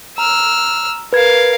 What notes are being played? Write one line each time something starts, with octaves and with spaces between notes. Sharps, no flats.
A#5 E6 F6
A#4 B4 F5 G#6